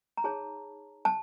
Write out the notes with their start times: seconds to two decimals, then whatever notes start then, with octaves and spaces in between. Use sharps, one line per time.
0.17 A#5
0.24 D#4 G#4 C#5 A5
1.05 A5